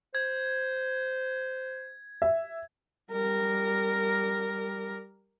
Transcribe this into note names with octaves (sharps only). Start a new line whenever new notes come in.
C5 G#6
E5
G3 A#4